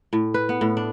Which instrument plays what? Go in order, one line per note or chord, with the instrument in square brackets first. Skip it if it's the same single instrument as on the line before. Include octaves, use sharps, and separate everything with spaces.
[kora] A2
B4
B3
A2
D4